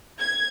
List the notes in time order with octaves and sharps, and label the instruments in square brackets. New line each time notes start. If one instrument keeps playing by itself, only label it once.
[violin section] G#6